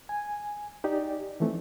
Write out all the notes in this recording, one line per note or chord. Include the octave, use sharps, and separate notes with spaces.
G#5
D#4 G4 D5
E3 F3 A3 C4